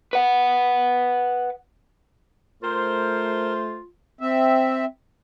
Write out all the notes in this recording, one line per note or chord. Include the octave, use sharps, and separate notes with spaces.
B4 F#5
A3 F4 A#4 C5
C4 E5